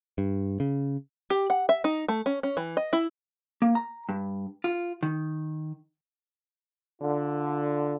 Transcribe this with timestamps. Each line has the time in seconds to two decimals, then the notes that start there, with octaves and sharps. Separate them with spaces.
0.18 G2
0.60 C#3
1.30 G4
1.50 F#5
1.69 E5
1.84 D#4
2.08 A3
2.26 C#4
2.43 C#4
2.57 E3
2.77 D#5
2.93 E4
3.62 A#3
3.75 A#5
4.09 G2
4.64 F4
5.03 D#3
7.01 D3 F4